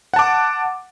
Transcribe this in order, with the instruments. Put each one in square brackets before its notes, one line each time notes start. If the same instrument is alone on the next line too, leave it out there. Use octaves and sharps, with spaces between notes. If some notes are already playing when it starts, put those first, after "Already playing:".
[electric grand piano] F#5
A5
D6